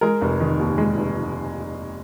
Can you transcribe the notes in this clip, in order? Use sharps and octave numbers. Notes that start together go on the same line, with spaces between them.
G#3 A#4
F1
D#3
D#2
G#3
F1